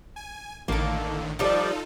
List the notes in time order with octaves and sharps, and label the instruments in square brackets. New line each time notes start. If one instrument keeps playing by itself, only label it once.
[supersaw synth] G#5
[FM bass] A1 [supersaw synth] A2 D3 D#3 [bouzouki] A#3 A4
[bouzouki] F3 G3 D4 [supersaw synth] D#4 F4 A4